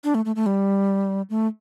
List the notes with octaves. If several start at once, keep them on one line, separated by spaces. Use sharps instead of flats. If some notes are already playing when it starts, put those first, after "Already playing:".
D4
A3
A3
A3
G3
A3